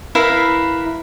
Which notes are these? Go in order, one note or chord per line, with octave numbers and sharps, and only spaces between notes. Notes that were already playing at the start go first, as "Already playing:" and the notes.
E4 A#4 B4 F5